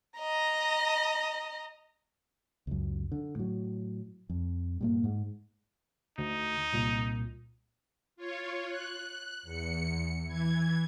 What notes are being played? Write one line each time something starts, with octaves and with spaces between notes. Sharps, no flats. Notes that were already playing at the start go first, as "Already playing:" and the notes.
D#5 A#5
C#2 F#2
D3
A2 F#3
F2
G2 A#2 A#3
G#2
D2 D#4
C2 A#2
F4 C#5
F#6
E2 C#7
E3 G#6